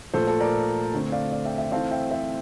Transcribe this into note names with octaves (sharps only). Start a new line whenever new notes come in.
A#2 F3 A3 A4 C5
A4 C5
A#4 D5
D3 A3 C4
D5 F5
D5 F5
E5 G5
E5 G5
E3 A3 C4 F5 A5
E5 G5
C5 E5